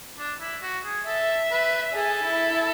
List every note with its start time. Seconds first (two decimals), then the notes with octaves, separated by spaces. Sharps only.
0.18 D4
0.41 E4
0.63 F#4
0.85 G#4
1.07 A4 E5
1.51 B4
1.95 G#4 A4
2.25 E4